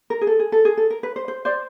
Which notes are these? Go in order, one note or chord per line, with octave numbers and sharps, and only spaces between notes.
A#4
G#4
A4
G#4
A4
G#4
A4
A#4
B4
C5
C5
C5 D5